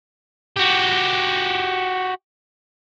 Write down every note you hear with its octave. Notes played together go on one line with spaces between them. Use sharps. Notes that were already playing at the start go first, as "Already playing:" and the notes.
F#4 G4